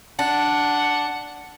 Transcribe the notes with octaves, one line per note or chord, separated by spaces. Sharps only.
D4 F#5